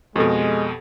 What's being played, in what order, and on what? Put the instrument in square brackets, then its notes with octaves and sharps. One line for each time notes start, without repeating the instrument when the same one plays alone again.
[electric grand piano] F2 B2 [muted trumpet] G#3 [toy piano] G4 A4